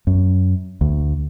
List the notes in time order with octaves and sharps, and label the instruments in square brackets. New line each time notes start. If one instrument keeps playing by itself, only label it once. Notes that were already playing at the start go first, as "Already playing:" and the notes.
[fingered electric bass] F#2
D2